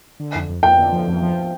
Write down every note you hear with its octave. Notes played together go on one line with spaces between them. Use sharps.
D3
F2
F2
F2 G5
D3
F3
F2
F3